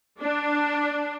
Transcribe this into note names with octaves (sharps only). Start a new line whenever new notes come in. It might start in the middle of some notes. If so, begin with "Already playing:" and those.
D4